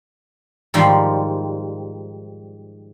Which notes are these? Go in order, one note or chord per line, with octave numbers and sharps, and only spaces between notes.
G#2 D#3 F3 G3 G5